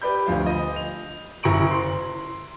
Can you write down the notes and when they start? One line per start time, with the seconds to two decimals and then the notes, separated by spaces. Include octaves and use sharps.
0.02 G4 B4 D5 B5 G6
0.27 D2 F3 F5
0.46 D#5
0.76 F7
1.43 F#1 E4 A#5 C#6 D7 F#7
1.70 C6